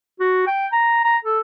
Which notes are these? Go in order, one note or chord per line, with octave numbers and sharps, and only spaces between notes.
F#4
G5
A#5
A#5
A4